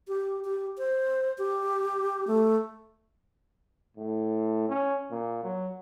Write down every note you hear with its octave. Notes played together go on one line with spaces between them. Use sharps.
G4
G4
C5
G4
A3
A2
C#4
A#2
F#3